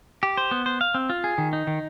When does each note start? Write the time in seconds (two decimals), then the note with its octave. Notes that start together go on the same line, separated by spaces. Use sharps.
0.23 G4
0.37 C5
0.51 B3
0.66 C5
0.81 F5
0.94 C4
1.10 F4
1.24 G#4
1.38 D#3
1.53 D#4
1.67 D#3